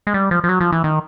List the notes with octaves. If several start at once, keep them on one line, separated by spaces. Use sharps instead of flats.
G#3
G3
F3
F3
F#3
F3
E3
D#3